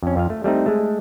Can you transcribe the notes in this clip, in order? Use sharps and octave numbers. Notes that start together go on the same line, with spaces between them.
F2 C#4
F2 F4 F5
A3
G3 A3 C4 D#4
G#3 A3